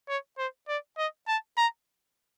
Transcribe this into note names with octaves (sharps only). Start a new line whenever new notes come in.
C#5
C5
D5
D#5
A5
A#5